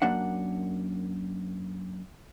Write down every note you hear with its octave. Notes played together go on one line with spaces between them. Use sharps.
F#2 A#3 D4 F#5